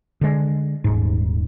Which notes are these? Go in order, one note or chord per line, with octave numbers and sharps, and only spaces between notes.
D3 G#3
D#1 G#2